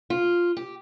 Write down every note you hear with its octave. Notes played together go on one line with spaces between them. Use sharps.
F4
G4